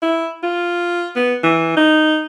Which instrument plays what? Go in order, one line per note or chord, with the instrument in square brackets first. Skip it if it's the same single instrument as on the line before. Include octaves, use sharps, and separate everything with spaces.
[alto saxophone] E4
F4
B3
E3
D#4